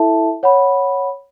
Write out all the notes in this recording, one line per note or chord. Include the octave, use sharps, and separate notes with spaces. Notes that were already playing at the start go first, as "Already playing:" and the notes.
Already playing: E4 A4 E5 A5
C#5 F#5 B5